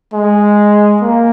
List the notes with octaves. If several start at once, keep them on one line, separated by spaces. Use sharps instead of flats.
G#3
A#3